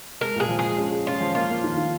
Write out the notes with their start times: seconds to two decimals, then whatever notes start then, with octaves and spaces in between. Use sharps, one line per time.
0.21 G#3 A#4
0.36 A#2 G#4
0.49 F3
0.59 G#4
0.64 G#3
0.78 C#4
0.92 G#3
1.07 C#4 F4
1.21 F3
1.35 A#3 F4
1.50 A#3
1.64 D#3
1.77 D#3